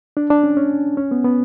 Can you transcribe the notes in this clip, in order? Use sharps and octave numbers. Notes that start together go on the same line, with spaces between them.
D4
D4
C#4
C#4
C#4
B3
B3